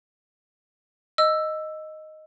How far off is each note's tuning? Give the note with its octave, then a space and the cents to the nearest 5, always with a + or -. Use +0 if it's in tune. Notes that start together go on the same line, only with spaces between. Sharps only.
D#5 +0 E6 +5